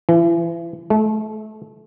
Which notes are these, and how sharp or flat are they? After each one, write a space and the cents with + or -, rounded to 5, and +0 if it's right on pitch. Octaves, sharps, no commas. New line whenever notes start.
E3 +35
A3 -30